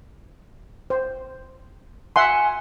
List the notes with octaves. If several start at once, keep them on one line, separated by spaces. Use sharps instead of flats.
C5
E5 F#5 G#5 C6